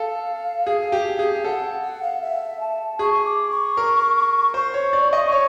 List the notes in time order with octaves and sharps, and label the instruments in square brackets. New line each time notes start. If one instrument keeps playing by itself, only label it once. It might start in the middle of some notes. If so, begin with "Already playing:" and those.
Already playing: [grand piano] A4 [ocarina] F5
[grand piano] G#4
G4
G#4
[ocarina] F5
[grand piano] A4 [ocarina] F#5
[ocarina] F#5
F5
E5
A5
[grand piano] G#4 [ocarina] C#6
[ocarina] D6
C#6
[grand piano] A#4
[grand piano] C5 [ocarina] C#6
[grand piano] C#5
D5
D#5
C#5